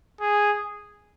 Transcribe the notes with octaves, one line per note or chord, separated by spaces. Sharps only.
G#4